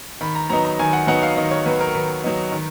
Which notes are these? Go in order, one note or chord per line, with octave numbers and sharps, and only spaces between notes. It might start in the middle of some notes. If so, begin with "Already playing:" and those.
D#3 B5
A#5
F#3 B3 D#4 A#5
A#5
D#3 G#5
F#5
F#3 B3 D#4 F#5
F5
D#3 D#5
C#5
F#3 B3 D#4 B4
A#4
D#3 B4
F#3 B3 D#4
D#3